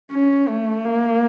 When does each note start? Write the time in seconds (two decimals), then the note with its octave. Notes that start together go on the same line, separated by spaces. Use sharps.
0.12 C#4
0.48 A3
0.85 A#3